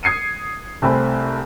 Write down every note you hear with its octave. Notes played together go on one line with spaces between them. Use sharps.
D#6 G#6 C7 C#7 D#7
C2 A3 C4 G#5 B5